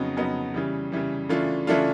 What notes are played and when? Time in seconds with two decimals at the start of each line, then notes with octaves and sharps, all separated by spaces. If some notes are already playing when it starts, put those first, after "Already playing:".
Already playing: F2 C#3 F#3 B3 D#4
0.17 F2 C#3 F#3 B3 D#4
0.54 C#3 E3 G3
0.92 C#3 E3 G3
1.29 C#3 E3 A3 D4 F4
1.67 C#3 E3 A3 D4 F4